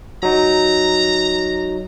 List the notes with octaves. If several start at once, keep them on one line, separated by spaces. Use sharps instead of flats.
F#3 D#4 A#5